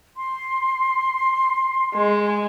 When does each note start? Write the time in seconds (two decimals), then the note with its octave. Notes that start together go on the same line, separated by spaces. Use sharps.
0.17 C6
1.94 G#3